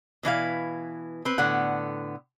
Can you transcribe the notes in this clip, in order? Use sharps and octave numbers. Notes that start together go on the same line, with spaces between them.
B2 E3 E4 F5
C4 B4
A2 D3 B3 F#5